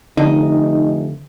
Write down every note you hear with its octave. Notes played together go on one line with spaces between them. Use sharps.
F1 D3 D#4